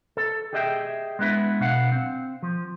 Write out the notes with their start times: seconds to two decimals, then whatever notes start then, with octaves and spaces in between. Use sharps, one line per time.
0.17 A4
0.53 G4 G#4 D#5 E5 F#5 G5
1.19 G#3 B3 D4 E4 B4
1.60 B1 B2 D4 F5 F#5
1.92 C4
2.43 F3